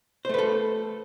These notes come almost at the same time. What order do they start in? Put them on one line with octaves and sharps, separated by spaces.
C5 A3 B4 A4